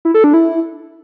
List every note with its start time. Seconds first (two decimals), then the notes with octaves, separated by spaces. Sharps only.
0.05 E4
0.14 A4
0.24 D4
0.34 E4